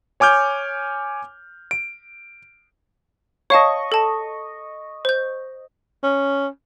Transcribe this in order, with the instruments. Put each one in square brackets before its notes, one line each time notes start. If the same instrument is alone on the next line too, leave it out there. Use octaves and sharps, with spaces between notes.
[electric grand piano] C#5 G#5 D6 F6 G6
D7
[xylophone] C#5 F5 A5 [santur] D#5 C#6
[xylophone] A4 A5
C5 G6
[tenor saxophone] C#4